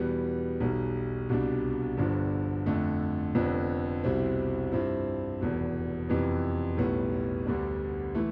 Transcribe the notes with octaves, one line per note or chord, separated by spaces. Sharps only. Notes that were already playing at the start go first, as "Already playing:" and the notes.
Already playing: E2 B2 G3 B3
B1 B2 G3
C2 B2 G3 D4
G1 G2 D3 F3
F2 D3 A3
F1 F2 D3 F3 B3
C2 B2 G3 C4 E4
G2 F3 C4 E4
F1 E2 B2
F2 C3 E3 B3
B1 A2 G3 B3
D2 D3 G3 B3 D4
E3 A3